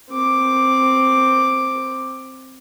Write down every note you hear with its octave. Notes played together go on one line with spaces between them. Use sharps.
C4 D6